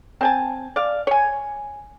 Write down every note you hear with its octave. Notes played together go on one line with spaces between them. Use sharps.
C4 G#5 A5
D5 F5
C#5 G#5